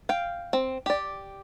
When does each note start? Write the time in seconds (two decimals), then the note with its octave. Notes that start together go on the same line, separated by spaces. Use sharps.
0.09 F5 G5
0.53 C4
0.86 G4 D5